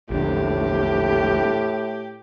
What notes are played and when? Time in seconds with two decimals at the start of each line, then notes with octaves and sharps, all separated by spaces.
0.10 A#1 E2 A2 D3 G4